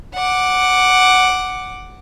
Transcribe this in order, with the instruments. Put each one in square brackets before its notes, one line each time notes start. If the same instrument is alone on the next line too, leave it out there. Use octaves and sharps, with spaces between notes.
[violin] F#5 D6